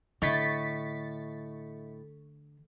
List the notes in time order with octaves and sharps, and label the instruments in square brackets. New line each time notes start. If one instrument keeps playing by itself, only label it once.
[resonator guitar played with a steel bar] A2 [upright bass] D3 [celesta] D#5 E5 [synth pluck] C#6 A6 B6